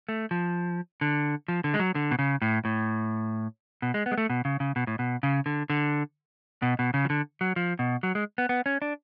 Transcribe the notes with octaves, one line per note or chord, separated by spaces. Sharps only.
A3
F3
D3
F3
D3
G#3
F#3
D3
B2
C#3
A2
A2
B2
G#3
B3
G#3
A3
B2
C#3
C#3
B2
A2
B2
C#3
D3
D3
B2
B2
C#3
F3
D3
F#3
F3
B2
F#3
G#3
B3
B3
C#4
D4